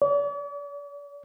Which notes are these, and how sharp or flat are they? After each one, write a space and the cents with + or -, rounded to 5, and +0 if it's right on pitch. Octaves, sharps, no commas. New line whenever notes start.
D5 -45